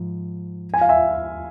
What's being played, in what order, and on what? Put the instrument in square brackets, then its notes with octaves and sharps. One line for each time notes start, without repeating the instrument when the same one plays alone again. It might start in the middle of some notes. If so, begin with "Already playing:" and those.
Already playing: [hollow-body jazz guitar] G#2 F3
[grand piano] G#5
F5
E5 G#5